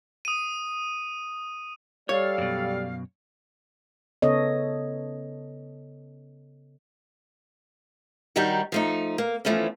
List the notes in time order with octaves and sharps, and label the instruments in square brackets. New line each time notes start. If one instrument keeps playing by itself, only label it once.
[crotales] D#6 D#7
[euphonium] G3 [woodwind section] A4 D5 F5 [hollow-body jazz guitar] C#5
[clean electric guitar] F#2 B2
[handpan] C#3 B3 A4 C#5 D#5
[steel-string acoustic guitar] D#3 F#3 G3 D4 D#4 F#4
F3 A3 D#4
A#3
E3 F3 A3 B3 C#4